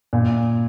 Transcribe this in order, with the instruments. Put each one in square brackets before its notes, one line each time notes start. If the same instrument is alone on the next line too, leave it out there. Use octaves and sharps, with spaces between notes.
[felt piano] A#2